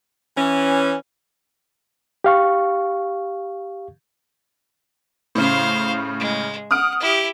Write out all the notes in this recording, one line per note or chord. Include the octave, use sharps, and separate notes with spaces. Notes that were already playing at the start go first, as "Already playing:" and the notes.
E3 C#4
G4 F5 C#6
A2 C#3 C5 F5
G#3
F#5 D#6 F6 D7
E4 G4